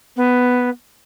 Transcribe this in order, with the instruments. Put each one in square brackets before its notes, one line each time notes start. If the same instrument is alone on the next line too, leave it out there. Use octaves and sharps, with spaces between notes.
[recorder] B3